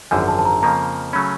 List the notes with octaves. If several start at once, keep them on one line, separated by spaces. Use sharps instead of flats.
G#1 F#2 D3 F3 G#5
A5
A5
A#5
F2 C#3 F3 A#3 A#5
C#3 F#3 A3 C#4 B5